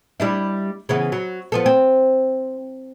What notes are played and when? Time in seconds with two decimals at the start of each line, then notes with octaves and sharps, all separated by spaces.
0.20 G3 D4 E4
0.89 C#3 E3 B3
1.12 F#3
1.52 F3 B3 A4
1.66 C4